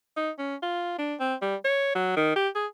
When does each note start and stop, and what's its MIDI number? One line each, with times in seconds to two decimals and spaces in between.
0.17 0.31 63
0.39 0.56 61
0.63 0.94 65
0.99 1.15 62
1.20 1.35 60
1.42 1.56 55
1.65 1.92 73
1.95 2.15 54
2.17 2.31 51
2.36 2.49 67
2.55 2.67 68